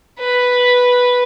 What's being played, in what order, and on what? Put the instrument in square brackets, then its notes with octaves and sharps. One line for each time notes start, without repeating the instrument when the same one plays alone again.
[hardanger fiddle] B4